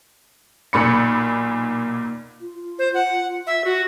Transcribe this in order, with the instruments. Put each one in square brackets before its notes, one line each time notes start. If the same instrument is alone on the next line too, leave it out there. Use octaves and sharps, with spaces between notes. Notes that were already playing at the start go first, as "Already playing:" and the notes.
[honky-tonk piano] B1 A#2 B5 C#7
[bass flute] F4
[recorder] C5
F#5
E5
F#4